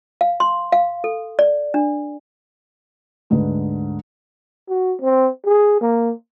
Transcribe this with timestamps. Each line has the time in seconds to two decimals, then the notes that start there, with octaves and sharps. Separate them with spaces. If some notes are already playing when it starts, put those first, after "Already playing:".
0.21 F5
0.40 C6
0.73 F5
1.04 A4
1.39 D5
1.74 D4
3.30 D2 G#2 D3 B4
4.69 F#4
5.01 C4
5.46 G#4
5.81 A#3